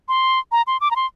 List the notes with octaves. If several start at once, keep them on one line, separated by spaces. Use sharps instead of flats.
C6
A#5
C6
D6
A#5
C6